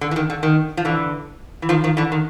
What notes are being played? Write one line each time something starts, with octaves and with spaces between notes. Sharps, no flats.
D3
E3
D#3
D3
D#3
F3
D3 E3
E3
D#3 F3
D#3 F3
D3 E3
D#3